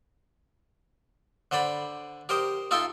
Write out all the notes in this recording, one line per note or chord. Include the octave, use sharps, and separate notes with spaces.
D3 C5 D5 B5
G4 A#4 C5 D#5
D#4 F4 A4 E5 G5 C6